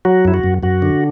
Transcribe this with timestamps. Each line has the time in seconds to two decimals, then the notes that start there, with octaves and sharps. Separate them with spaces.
0.05 F#3 F#4
0.25 F#2 E4
0.34 F#4
0.44 F#2
0.63 F#2 F#4
0.82 D3